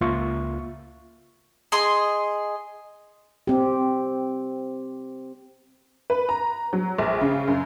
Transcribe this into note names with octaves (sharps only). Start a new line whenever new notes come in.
C#2 A#3 F4 E5 C#6
G#4 D#5 C6
C4 G4
B4
A#5
F#3
A#1
C#3
F#2